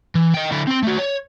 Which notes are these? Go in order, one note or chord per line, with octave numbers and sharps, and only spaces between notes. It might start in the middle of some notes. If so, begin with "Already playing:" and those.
E3
D#5 G5
D3 E4
C4 C6
A3 F#4
C#5